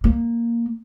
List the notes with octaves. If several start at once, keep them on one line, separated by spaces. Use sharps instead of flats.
A#3